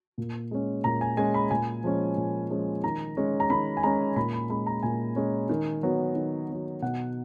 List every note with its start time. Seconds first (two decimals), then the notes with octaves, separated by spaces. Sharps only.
0.18 A#2
0.51 G#3 C#4
0.84 A#2 A#5
1.01 G#5
1.17 G#3 C#4 G#5
1.34 B5
1.51 A#2 G#5
1.84 F3 G#3 C#4
2.17 A#2
2.50 F3 G#3 C#4
2.84 D#3 A#5
3.17 G#3 C#4
3.40 A#5
3.50 D#3 B5
3.77 G#5
3.83 G#3 C#4 A#5
4.16 A#2 B5
4.33 B5
4.50 G#3 C#4 B5
4.67 A#5
4.83 A#2 G#5
5.16 G#3 C#4
5.49 D#3
5.83 F#3 B3
6.16 D#3
6.49 F#3 B3
6.82 B2 F#5